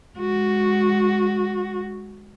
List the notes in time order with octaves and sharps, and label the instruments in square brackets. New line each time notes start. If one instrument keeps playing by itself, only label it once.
[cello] G#3 F#4